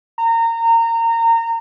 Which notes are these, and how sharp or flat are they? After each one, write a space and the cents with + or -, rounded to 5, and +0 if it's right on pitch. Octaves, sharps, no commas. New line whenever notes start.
A#5 -25